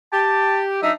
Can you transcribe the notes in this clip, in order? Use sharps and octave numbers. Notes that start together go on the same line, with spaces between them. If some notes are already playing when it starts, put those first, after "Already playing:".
G4 A5
F#3 D4 D#4 E5